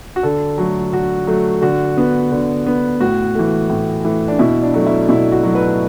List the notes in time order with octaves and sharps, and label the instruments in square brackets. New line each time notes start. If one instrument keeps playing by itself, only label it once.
[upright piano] F#4
D3 A4
F#3 A3
D3 F#4
F#3 A3
D3 F#4
B3
D3
B3
A2 F#4
E3 A3
A2
E3 A3
D4
B2 E4
D4
F#3 A3
E4
B2 E4
F#4
F#3 A3
B4